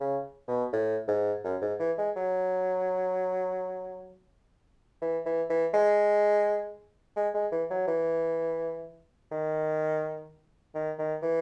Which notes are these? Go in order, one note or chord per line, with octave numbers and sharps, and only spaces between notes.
C#3
B2
A2
G#2
F#2
G#2
E3
G#3
F#3
E3
E3
E3
G#3
G#3
G#3
E3
F#3
E3
D#3
D#3
D#3
E3